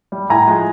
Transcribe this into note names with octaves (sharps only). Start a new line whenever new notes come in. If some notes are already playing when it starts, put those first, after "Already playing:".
G3
A2 G#5 A#5
F3 G#3